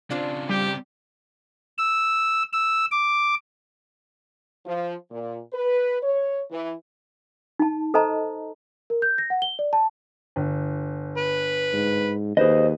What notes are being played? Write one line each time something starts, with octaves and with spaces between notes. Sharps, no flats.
C#3 C4 D4 F4 C5
G3 G4
E6
E6
D6
F3
A#2
B4
C#5
E3
D#4 A5
A4 C5 D#5 A5 A#5
A#4
G6
A#6
F#5
G7
D5
A5
G1
B4
G#2
D#2 G#4 B4 C5 D#5